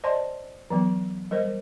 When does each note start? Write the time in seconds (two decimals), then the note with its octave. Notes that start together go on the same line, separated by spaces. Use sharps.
0.04 C5 D5 D#5 A5 C6
0.70 E3 F#3 B3
1.31 G3 A#4 C5 D#5